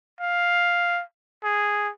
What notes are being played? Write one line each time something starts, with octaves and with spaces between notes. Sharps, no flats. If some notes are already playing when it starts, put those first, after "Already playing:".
F5
G#4